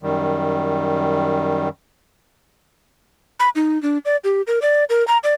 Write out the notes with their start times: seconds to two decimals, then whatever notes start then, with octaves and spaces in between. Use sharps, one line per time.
0.03 F#2 D#3 G3
3.40 B5
3.55 D#4
3.83 D4
4.05 D5
4.24 G4
4.47 A#4
4.62 D5
4.90 A#4
5.08 A#5
5.24 D5